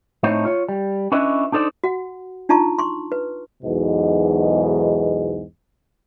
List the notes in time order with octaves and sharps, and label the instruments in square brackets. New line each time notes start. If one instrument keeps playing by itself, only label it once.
[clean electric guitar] A2 A3 C4 D#4 C5 C#5
F4 C#5
G3
C#4 D4 E4 B4 D#5
D4 D#4 A4 C5 D5
[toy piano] F#4 F#5
D4 D#4 F4 A5 A#5 C#6
C6 C#6
B4
[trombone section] B1 E2 G#2 B2